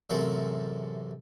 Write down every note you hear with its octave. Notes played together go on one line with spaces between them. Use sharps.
A1 F#2 C3 G#3 A3 A#4